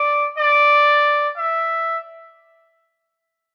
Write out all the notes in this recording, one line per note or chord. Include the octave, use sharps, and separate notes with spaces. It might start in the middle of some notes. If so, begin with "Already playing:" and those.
Already playing: D5
D5
E5